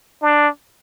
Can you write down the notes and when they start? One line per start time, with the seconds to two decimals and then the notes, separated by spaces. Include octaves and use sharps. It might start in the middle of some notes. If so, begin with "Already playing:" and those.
0.22 D4